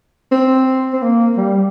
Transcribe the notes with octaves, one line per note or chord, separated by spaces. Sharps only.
C4
C4
A#3
G3